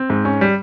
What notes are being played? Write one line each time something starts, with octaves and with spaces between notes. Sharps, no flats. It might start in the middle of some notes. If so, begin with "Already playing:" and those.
Already playing: C4
G#2
C#4
G3